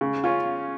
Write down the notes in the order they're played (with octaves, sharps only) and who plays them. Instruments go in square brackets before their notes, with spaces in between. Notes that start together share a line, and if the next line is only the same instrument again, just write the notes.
[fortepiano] C#3
C#4 F4